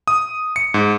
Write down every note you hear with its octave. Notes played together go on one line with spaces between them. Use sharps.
D#6
C#7
G#2